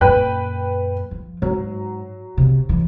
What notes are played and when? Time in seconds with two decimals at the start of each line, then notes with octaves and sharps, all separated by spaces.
0.01 F#2 A#2 B4 G5 F#6
1.11 F3
1.42 G#2 F#3
2.37 C3
2.69 E3